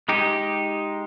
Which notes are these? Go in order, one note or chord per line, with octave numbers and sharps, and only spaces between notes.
G#3 D#4 G4